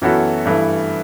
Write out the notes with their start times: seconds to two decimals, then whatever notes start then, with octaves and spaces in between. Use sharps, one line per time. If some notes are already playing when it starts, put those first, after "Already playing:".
0.02 F#2 E3 B3 F#4 A4
0.45 G2 E3 A3